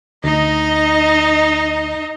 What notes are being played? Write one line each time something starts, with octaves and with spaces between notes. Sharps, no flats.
D2 D#4 D#5